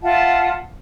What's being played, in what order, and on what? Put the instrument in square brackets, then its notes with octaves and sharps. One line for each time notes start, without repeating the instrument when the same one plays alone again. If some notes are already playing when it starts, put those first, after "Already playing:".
[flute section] F4 E5 F#5 A5